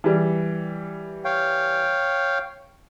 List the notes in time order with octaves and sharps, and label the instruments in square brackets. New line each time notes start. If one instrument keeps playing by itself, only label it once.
[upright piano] E3 G3
[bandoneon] C#5 F5 G5